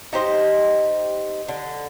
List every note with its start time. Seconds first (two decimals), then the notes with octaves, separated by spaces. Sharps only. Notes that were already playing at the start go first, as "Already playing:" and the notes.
0.13 D#4 G4 C5 D#5
1.48 D3